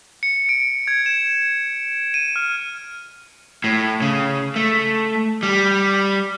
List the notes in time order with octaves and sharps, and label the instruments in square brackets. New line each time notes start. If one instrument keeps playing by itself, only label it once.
[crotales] C#7
D7
G#6
E7
D#7
F6
[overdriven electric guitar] A2
C#3
A3
G3